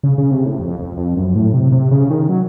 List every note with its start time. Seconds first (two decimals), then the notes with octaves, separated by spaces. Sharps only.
0.03 C#3
0.18 C#3
0.31 C3
0.46 A2
0.59 F2
0.79 F2
0.97 F2
1.17 F#2
1.35 A2
1.54 C3
1.72 C3
1.91 C#3
2.10 D#3
2.29 F#3